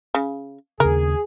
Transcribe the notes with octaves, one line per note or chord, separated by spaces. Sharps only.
C#3
D#2 C#3 G#4 A#4